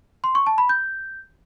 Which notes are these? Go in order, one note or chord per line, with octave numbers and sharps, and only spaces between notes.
C6
C#6
A5
B5
G6